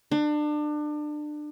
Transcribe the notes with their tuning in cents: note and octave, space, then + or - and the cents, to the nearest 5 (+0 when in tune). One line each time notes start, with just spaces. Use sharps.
D4 +30